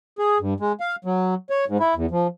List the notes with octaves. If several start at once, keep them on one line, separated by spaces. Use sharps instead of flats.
G#4
G2
G#3
F5
F#3
C#5
G#2
E4
E2
F3